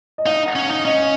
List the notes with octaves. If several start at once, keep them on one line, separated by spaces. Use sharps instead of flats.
D#5
D#4 F5
F#5
C#4
F5
D#4
C#4 D#5